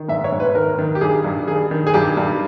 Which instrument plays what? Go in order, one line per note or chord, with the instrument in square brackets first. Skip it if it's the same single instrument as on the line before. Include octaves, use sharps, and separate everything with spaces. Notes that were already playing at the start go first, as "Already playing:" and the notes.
Already playing: [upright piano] D#3
G#2 E5
C#5
G#2
B4
D#3 A#4
D#3
G4
G2 G#4
G2
D#3 G#4
D#3
G#4
G2 G4
G2